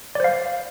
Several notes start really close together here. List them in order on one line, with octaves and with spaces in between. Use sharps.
D5 C5 F5